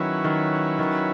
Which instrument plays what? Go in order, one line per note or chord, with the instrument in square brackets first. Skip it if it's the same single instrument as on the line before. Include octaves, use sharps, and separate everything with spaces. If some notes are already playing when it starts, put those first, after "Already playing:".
Already playing: [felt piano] D#3 [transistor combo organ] F#3 C#4 E4 B4
[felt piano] D#3
D#3